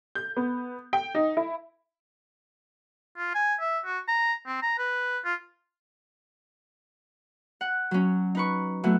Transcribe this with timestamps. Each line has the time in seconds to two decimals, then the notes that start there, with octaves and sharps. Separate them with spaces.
0.15 G6
0.37 B3
0.93 G5
1.15 D#4
1.37 E4
3.18 F4
3.35 G#5
3.61 E5
3.85 F#4
4.08 A#5
4.47 C4
4.62 A#5
4.78 B4
5.25 F4
7.61 F#5
7.91 F#3 C#4
8.35 D#4 B4 C#6
8.83 F#3 A3 B3 C#4 E4 F#4